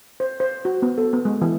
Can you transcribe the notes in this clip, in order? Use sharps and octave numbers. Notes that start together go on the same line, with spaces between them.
C5
C5
F#4
B3
A4
B3
G#3
E3